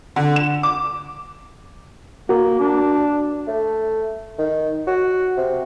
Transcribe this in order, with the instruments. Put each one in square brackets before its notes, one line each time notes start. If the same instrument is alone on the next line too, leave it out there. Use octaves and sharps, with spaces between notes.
[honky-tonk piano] D3
E7
D6
[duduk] A#3 [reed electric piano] F#4 A#4
[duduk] D4
[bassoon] A3
D#3
F#4
C3